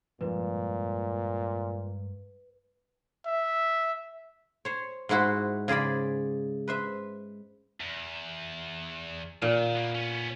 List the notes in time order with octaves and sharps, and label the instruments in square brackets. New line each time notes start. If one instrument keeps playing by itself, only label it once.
[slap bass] G2 F3 G#3 [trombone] A#2 [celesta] B4
[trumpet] E5
[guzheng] C5 C#5
G#2 G#3 E4 F#4 C5
C#3 G#4 C5 D5 B5
B4 C5 E5
[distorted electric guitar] E2
[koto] A#2 [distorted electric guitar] D#3
[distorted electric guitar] A#3 B3
B3 C#4